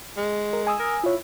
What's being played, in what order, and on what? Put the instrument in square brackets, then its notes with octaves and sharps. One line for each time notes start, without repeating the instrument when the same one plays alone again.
[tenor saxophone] G#3
[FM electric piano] A#4
G#5 D#6 E6
[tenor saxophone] A#4
[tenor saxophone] E4 [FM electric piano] F4 C#5